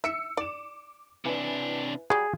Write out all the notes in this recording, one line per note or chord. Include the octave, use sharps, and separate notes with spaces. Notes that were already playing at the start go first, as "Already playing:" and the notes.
E5 E6 C#7
D5 D6 E7
C3 D4 E4 B4 G#5
F#3 G3 G#4